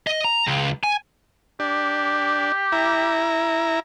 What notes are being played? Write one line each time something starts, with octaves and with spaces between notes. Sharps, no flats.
D#5
A#5
C#2
G#5
D4 G4
E4 A#5